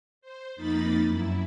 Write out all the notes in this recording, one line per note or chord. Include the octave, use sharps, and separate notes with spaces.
C5
F2 A#3 D#4 B5 A6
F#2 E4